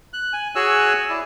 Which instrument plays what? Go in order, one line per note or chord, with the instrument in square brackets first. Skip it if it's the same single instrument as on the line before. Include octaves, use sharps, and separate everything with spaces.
[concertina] F#6
G#5
F#4 G#4 C#5 G#5 E6 F#6
E4 D5